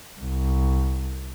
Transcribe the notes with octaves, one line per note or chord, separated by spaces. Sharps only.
C2